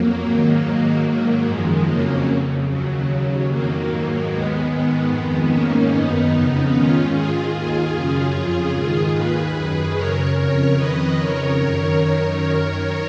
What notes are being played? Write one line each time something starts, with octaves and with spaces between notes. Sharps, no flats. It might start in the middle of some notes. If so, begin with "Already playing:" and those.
Already playing: F2 F#3 A#3
G#2 D#3
G#2 D#3
G#2 D#3 F#3 A#3
F#2 D#3 F3 G#3
F2 C#3 F#3 A#3
F2 C#3
D#2 C#3 F#3
D#2 C#3
F2 D#3 F#3 A#3
G#2 D#3
D#2 D#3 G#3 B3
G#2 D#3 G#3 B3
F2 D#3
G#2 D#3 A#3 C#4
F#2 D#3 B3 D#4
F2 C#3
G#2 D#3 C#4 F4
G#2 D#3 F4 G#4
D#2 D#3 F4 G#4
F#2 C#3
F2 C#3
G#2 D#3
D#2 D#3 G#4 B4
F#2 D#3
F#2 C#3 A#4 C#5
F2 C#3 A#4 C#5
F2 D#3 B4 D#5
F2 C#3 A#4 C#5
F#2 D#3
F#2 D#3
F#2 D#3
D#3 A#4 C#5